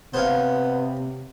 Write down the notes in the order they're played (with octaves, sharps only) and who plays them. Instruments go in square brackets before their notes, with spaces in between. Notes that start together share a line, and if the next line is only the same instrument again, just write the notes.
[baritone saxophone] C3 [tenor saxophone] B3 [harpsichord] C5 C#5 F5